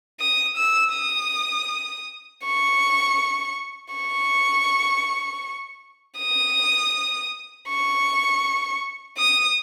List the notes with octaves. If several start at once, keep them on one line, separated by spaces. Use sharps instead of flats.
D#6
E6
D#6
C#6
C#6
D#6
C#6
D#6